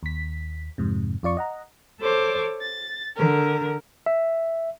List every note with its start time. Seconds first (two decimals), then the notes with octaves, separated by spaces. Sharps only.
0.03 D#2 B6
0.78 F2 G#2 C3
1.23 F2 F4 D5 C#6
1.37 D#5 F#5 A#5
1.99 A4 C5 C#5 D6
2.59 A6
3.15 D3 A#4
4.06 E5